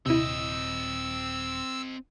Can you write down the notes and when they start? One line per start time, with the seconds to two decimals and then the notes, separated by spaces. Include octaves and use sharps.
0.06 D#1 C3 C4 E4 D#5 E6